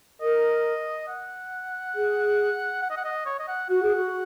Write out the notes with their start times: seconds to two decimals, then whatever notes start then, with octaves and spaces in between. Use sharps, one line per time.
0.21 A#4 D#5
1.08 F#5
1.95 G#4
2.82 F#5
2.90 D#5
2.97 F#5
3.04 D#5
3.26 C#5
3.39 D#5
3.48 F#5
3.70 F#4 F#5
3.83 G#4
3.96 F#4